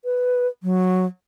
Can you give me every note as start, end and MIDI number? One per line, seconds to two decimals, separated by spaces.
0.05 0.47 71
0.63 1.06 54